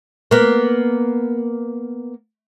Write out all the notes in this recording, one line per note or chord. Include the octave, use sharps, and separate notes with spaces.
A#3 B3